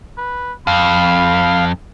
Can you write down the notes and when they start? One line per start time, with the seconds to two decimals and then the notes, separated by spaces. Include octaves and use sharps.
0.18 B4
0.67 F2 F5 B5